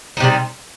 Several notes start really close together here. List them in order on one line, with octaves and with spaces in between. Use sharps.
D#4 C3 G3